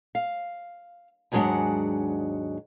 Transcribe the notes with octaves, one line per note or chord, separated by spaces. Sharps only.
F5
D#2 G#2 F#3 G#3 D4 F#5